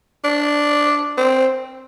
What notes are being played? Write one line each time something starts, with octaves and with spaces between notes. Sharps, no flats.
D4
C4